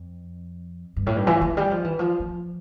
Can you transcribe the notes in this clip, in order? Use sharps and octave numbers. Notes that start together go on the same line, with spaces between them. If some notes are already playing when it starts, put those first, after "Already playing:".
Already playing: F2
G2
A2
G2
E3
E3
G3
F3
E3
F3
F3